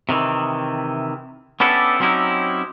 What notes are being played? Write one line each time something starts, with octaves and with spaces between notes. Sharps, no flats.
C3 D#3 E3
B3 C#4 D4 E4 G4 A4
F#3 C4 C#4 D#4 E4 G4